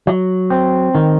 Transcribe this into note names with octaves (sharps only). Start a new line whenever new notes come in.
F#3
C4
D#3